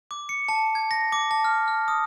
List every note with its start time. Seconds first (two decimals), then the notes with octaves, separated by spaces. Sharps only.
0.11 D6
0.29 C#7
0.49 A5
0.75 G#6
0.91 A#6
1.12 D6
1.31 A5
1.44 F6
1.68 F6
1.88 D#6